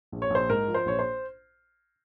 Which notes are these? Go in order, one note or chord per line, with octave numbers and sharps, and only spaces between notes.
A#1
C#5
A#1 C5
G#2 A#4
F3
C5
A#1 C#5
C5